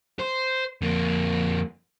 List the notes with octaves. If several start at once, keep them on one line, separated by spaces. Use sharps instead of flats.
C5
F2 A#3